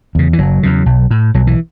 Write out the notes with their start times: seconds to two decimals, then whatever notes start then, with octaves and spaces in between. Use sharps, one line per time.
0.15 E2 C#3
0.33 E3
0.39 F#1 F#3
0.63 E2 C#3
0.86 B1
1.11 A2
1.34 B1 F#3
1.47 E3